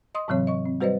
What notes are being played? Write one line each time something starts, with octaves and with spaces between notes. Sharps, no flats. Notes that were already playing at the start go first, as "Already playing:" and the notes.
D#5 C6 D#6
G#2 C3 E3 F#3 C4 C#5
D#5 C#6
C4
G3 F#4 B4 C5 D5 D#5